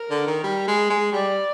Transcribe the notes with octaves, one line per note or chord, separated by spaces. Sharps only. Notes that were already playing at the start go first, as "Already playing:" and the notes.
Already playing: A#4
D3
D#3
G3
G#3
G#3
G3 D5